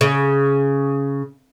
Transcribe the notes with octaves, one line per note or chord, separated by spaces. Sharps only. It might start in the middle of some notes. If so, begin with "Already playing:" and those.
C#3